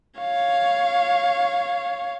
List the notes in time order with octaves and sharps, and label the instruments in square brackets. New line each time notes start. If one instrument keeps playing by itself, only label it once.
[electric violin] C#5 F5